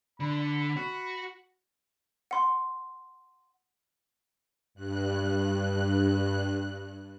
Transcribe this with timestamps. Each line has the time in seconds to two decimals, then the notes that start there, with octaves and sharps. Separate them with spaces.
0.20 D3 B5
0.77 F#4
2.31 F#5 C6
4.74 G2 F#6